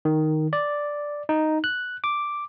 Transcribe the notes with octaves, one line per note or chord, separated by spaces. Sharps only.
D#3
D5
D#4
F#6
D6